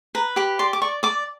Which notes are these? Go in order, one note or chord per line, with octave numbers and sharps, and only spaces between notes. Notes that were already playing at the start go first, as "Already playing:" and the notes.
B4 A#5
G4 B5
D5 C6
D6
D5 C#6
D5 D6